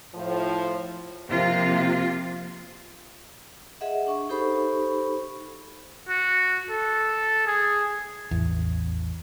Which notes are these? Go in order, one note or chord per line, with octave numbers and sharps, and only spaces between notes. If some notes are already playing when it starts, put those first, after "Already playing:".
A2 F3
C3 F3 A#3 F4
G#4 D#5 E5 F#5
D4 C#6
D#4 G4 A4 C5 B5 C#6
F#4
A4
G#4
A1 E2